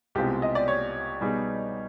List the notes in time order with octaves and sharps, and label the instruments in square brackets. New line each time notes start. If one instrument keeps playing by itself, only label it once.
[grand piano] C2 B2 G#3 C4 F4 [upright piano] G4
[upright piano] D#5
D5
C#5
[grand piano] B2 G3 B3 D#4 G#4